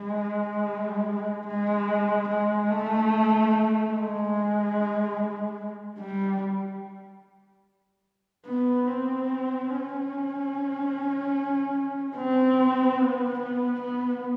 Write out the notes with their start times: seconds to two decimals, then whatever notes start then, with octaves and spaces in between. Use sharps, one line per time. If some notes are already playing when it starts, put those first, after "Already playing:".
Already playing: G#3
1.47 G#3
2.29 G#3
2.70 A3
3.94 G#3
6.00 G3
8.46 B3
8.87 C4
9.70 C#4
12.16 C4
12.99 B3
13.39 B3
13.81 B3